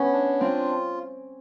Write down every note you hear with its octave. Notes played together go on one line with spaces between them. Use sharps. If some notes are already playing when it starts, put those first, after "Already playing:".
Already playing: B3 C#4
D4
C4 F4